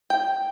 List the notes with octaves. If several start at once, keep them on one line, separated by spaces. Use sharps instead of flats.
G5